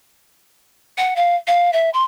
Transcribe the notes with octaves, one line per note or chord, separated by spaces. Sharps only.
F#5
F5
F5
E5
C6